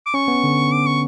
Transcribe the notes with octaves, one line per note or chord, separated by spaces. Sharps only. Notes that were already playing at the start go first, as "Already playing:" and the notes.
D6
C#4 C#6
B3
D3
D6
C#6